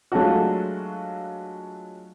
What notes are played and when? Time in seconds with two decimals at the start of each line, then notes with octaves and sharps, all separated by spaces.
0.12 F#3 G#3 A3 D4 F4 F#4